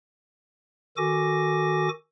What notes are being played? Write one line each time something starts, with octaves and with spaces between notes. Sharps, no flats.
D#3 F#4 A4 G#5 D6 A#6